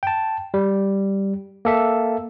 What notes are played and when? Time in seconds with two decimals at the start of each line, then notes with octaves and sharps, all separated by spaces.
0.03 G5 A5
0.54 G3
1.65 A#3 A4 E5